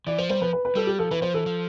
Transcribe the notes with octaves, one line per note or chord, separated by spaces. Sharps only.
E3 D5
F3 C5
G3 C5
F3 B4
B4
B4
G3 A4
G4
F3 A4
E3 B4
F3 C5
E3 A4
F3